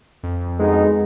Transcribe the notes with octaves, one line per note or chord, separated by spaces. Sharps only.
F2
D2 G#3 B3 D#4 G#4